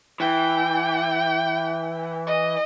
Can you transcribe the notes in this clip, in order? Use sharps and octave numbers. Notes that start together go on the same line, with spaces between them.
E3 G5
D#5